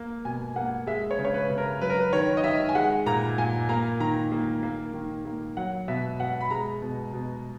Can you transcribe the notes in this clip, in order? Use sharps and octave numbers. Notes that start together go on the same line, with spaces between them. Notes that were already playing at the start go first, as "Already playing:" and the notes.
Already playing: A#3
B2 G#5
A#3 F#5
G#3 E5
C#5
C#3
C#5
B4
C#3
A#4
F#3 B4
A#4
B4
D#3 C#5
D#5
D#3 E5
G#5
G#3 F#5
A#2 A#5
A#2 G#5
A#3 A#5
D#3 A#5
A#3
A#3
D#3
A#3
F#3 F#5
B2 E5
B2 F#5
B5
G#3 A#5
B2
B2